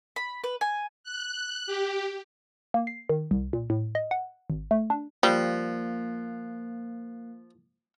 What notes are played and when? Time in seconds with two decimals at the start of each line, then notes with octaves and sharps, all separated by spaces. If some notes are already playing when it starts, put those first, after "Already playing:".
0.16 B5
0.44 B4
0.61 G#5
1.04 F#6
1.67 G4
2.74 A#3
2.87 C7
3.09 D#3
3.31 C2
3.53 A#2
3.70 A2
3.95 D#5
4.11 F#5
4.50 G#1
4.71 A3
4.90 D4
5.23 F3 G3 A#3 F#6 C7